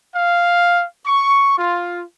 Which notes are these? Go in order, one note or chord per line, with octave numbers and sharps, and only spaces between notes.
F5
C#6
F4